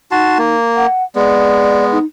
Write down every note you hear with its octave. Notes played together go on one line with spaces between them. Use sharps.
D#4 F#4 A5 C6
A#3
F#5
G#3 B3 D5
D#4